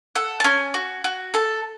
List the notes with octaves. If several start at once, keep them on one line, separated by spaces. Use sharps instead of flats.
A4 F#5
A5
C#4 G#5
F#4
F#4
A4 A5